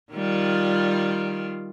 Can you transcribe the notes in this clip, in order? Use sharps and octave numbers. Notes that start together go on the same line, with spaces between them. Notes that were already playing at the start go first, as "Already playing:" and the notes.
D#3 G3 F4